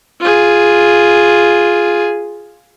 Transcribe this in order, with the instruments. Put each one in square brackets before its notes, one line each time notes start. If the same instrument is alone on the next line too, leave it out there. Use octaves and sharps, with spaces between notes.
[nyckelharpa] F4 G#4